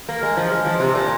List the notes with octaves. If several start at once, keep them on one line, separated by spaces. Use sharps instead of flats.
A#3
G#3
F3
G#3
F3
C3
A#2